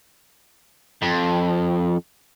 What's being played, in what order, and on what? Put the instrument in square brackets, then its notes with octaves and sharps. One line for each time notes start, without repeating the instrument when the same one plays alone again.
[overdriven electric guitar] F2